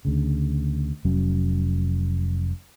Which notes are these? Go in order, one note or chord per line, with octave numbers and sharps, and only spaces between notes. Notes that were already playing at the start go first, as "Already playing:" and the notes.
D2 C#3
F1 F#3 C#4